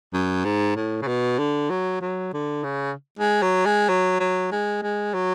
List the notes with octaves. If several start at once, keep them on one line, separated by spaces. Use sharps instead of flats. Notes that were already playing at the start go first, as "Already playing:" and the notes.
F#2
G#2
A2
C#3
B2
D3
F#3
F#3
D3
C#3
G#3
F#3
G#3
F#3
F#3
G#3
G#3
F#3